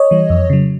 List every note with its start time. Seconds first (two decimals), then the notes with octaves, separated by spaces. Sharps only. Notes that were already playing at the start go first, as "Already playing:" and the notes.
Already playing: C#5 D#5
0.11 E3 G3
0.30 F2
0.50 C#3 F#3